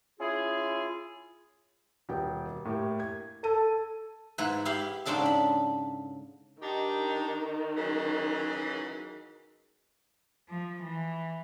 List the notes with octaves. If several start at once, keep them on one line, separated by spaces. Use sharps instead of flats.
C#4 E4 F4 G#4
D#1 B2 G5
A2 A#3 G4
G#6
A4 D#7
G#2 E4 B4
E4 G4 F5 B5
G#2 C#3 C4 D4 A4 E5
B5
D#3 D4 D#4 G4
C#3 E3 F#3
F3
E3